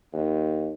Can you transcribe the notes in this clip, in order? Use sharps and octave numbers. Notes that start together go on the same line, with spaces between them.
D#2